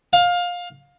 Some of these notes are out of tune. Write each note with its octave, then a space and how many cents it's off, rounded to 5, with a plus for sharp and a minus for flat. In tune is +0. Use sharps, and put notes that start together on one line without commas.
F5 +20